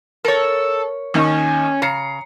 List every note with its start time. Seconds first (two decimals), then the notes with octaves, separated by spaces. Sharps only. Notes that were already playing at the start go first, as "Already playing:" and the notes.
0.25 A4 A#4 C#5
1.14 D#2 D#3 C#4 D#5
1.82 C#3 A#5 C7 C#7